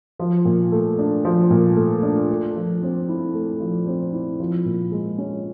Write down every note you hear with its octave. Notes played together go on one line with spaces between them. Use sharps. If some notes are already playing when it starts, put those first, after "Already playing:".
F3
A#2
A3
D4
F3
A#2
A3
D4
A3
F3
C4
E4
A3
F3
C4
E4
F3
A#2
G#3
C#4